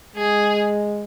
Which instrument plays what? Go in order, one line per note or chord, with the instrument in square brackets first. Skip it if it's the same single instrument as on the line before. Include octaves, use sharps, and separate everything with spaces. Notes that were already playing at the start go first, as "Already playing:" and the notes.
[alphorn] G#3 [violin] G#4